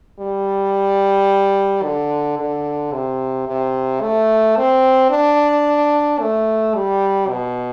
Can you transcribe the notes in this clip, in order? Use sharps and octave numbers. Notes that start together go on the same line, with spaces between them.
G3
D3
D3
C3
C3
A3
C4
D4
A3
G3
B2